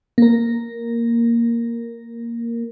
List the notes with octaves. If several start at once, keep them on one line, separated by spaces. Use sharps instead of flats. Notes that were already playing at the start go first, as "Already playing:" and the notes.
A#3 A#4